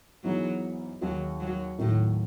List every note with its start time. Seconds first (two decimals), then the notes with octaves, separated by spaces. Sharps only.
0.24 G#2 E3 F#3 B3 D#4 G#4
1.01 D#2 D#3 F#3 G#3
1.40 F#3
1.79 D#2 A2 D#3 F#3